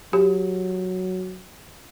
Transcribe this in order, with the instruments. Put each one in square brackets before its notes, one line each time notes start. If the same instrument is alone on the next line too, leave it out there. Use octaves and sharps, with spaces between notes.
[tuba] F#3 [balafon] G4